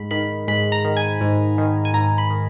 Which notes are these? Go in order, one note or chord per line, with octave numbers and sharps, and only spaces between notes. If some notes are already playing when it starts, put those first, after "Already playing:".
Already playing: G#2 B5
D#3 B5
G#2 B5
A#5
D#3
G#5
G#2
D#3
G#5
G#2 A#5
B5
D#3